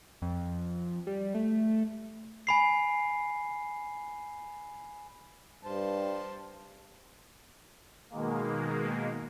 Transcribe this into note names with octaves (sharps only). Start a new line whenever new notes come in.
F2
G3
A3
G#5 B5 C7
G2 C5 A5
B2 D#3 G#3 A#3